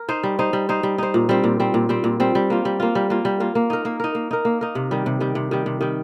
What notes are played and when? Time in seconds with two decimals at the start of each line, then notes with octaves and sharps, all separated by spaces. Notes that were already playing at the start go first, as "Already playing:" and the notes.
Already playing: A#4
0.09 D#4 C5
0.23 G3
0.39 D#4 C5
0.53 G3
0.69 D#4 C5
0.83 G3
0.98 D#4 C5
1.14 A#2
1.29 G3 C4
1.44 A#2
1.60 G3 C4
1.74 A#2
1.89 G3 C4
2.04 A#2
2.20 G3 C4
2.35 G3
2.50 A#3 F4
2.65 G3
2.80 A#3 F4
2.95 G3
3.10 A#3 F4
3.25 G3
3.40 A#3 F4
3.55 A#3
3.70 D#4 A#4
3.85 A#3
4.00 D#4 A#4
4.15 A#3
4.31 D#4 A#4
4.45 A#3
4.61 D#4 A#4
4.75 C3
4.91 D#3 G3
5.06 C3
5.20 D#3 G3
5.35 C3
5.51 D#3 G3
5.66 C3
5.81 D#3 G3